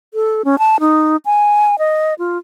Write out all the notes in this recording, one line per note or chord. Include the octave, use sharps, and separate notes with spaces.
A4
C#4
A5
D#4
G#5
D#5
F4